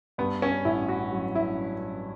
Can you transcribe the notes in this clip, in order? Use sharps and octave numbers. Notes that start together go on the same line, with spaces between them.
G2 B3
C#4
A1 E4
F#4
F#3
E4